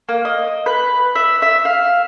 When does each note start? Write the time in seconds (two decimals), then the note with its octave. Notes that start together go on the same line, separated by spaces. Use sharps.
0.09 A#3
0.25 D#5
0.66 B4
1.15 E5
1.42 E5
1.65 F5